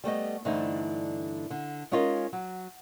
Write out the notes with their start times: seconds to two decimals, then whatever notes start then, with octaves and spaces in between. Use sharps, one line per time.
0.04 G3 A3 B3 D#5
0.45 G2 D3 E3 A3 C4 D#4
1.50 D3
1.91 G#3 C#4 D#4 F4 A#4 D#5
2.33 F#3